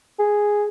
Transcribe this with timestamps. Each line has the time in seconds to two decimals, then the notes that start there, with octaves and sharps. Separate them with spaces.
0.19 G#4